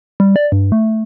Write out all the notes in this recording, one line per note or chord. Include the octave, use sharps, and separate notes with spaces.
G3
D5
G2
A3